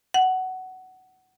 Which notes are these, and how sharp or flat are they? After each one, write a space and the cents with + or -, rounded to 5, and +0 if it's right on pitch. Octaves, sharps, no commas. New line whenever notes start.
F#5 +15